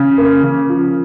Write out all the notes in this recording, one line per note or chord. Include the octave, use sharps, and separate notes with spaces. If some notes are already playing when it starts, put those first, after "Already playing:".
Already playing: C#3
A#3
C#3
F3